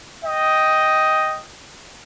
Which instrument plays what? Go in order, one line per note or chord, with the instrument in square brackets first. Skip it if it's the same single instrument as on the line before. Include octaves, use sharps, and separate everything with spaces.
[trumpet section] D#5 G5